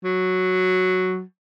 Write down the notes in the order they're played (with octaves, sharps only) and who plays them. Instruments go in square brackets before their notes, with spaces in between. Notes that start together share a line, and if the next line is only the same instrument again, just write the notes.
[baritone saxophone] F#3